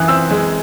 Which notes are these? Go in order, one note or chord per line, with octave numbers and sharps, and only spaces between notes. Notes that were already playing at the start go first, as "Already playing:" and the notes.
Already playing: F#2 E3 D#6 F#6
C4 E6
G#3